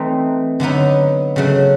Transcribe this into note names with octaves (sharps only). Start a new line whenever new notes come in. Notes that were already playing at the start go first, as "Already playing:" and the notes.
Already playing: E3 A3 C4 D#4
D3 F#3 B3 D#4
C#3 F#3 A3